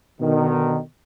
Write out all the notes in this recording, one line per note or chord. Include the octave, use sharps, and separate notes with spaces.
B2 D3 D#3